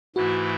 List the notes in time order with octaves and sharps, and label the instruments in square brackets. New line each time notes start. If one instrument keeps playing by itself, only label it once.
[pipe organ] G#2 E3 A3 E4 [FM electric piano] F#4